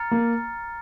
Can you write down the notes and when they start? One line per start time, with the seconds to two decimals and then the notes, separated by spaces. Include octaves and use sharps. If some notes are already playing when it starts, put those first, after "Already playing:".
Already playing: A#5 F6 A6 C#7
0.11 A#3